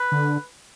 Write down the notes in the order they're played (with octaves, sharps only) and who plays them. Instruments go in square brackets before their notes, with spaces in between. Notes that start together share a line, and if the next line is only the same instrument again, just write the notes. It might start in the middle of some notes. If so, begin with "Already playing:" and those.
Already playing: [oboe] B4
[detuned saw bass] D3